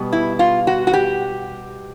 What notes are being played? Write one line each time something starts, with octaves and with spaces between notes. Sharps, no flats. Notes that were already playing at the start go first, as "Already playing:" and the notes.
Already playing: B2 G3 B3
E4
F4
F#4
F#4
G4